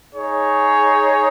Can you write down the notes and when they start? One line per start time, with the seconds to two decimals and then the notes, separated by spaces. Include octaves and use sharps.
0.14 D#4 G#4 C#5